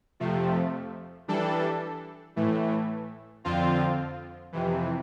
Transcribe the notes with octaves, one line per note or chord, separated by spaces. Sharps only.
F2 C3 F3 A3
E3 G3 D4 A4
A2 E3 A3
F2 D3 F3 C4 F4
F2 C3 E3